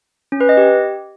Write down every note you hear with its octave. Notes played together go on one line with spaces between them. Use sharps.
C#4
B4
D#5
G4